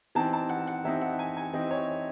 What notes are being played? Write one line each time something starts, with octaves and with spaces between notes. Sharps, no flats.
E3 C4 D#4 A5
A5
F#5
F#5
E3 C4 D#4 E5
F#5
G#5
G#5
E3 C4 D#4 D#5
C#5